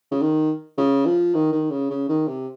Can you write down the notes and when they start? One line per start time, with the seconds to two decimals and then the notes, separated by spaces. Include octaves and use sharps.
0.11 C#3
0.21 D#3
0.77 C#3
1.05 F3
1.34 D#3
1.52 D#3
1.71 C#3
1.90 C#3
2.09 D#3
2.28 C3